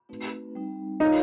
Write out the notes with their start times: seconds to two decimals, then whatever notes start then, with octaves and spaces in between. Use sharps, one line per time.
0.09 A3 C4 D#4 F#4 B4
0.55 G3 C4 D#4
1.00 D#4 F4 A#4 C#5 F5